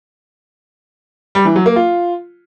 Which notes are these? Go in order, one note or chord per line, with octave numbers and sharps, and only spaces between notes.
G3
E3
F#3
A#3
F4